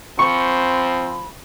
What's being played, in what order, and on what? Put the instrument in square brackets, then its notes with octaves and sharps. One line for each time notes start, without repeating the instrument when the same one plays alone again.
[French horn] F3 [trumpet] C4 [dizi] B5 [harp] C#6